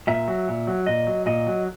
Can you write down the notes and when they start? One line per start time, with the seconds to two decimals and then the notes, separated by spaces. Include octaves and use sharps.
0.07 A#2 E5
0.28 F#3
0.48 A#2
0.67 F#3
0.86 A#2 D#5
1.07 F#3
1.26 A#2 D#5
1.47 F#3